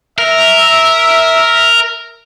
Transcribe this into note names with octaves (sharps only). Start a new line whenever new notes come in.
A#4 E5